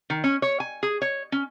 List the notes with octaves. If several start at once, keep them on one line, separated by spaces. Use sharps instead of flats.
D#3
C#4
C#5
G#5
G#4
C#5
C#4